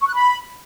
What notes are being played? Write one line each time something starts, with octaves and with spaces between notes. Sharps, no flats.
C#6
F#6
B5